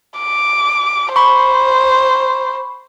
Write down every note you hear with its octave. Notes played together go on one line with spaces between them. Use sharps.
D6
C5 B5 C#6